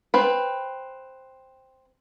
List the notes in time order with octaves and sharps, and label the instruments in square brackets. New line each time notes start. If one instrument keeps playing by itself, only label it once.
[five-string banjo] C4 B4